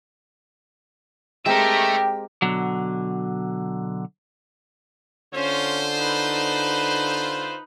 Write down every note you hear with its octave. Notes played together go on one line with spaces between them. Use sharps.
G#3 C4 G4 A4 A#4 E5 G5
B2 D3 F#3
D3 C#4 F4 C5
D#4 B4